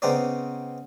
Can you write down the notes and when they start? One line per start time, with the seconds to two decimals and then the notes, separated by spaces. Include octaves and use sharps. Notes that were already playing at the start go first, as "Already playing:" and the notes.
0.02 C#3 B3 C4 D#4 D5